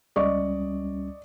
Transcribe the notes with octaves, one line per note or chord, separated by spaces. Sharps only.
C#2 G3 C#4 D5 D#5 C#6